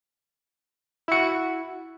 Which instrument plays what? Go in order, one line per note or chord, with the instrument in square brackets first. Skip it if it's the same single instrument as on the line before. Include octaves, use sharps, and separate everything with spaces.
[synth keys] E4 F#4 [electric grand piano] E6 C#7